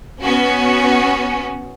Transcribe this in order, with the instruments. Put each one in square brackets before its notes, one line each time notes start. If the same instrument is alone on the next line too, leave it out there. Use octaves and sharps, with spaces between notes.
[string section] B3 C#4 F#4